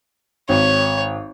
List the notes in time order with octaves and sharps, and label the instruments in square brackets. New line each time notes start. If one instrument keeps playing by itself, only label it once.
[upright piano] G#1 [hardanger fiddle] C#5